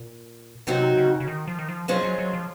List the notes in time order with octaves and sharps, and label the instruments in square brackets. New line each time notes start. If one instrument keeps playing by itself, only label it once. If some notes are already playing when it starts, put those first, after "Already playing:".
Already playing: [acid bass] A#2
[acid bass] C3 [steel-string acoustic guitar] D#3 F#3 C4 D#4 F#4
[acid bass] C#3
C#3
D#3
F3
D#3
F3
[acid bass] F#3 [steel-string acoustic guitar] G#3 C#4 F4 G#4 C5
[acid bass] F#3
F#3
F3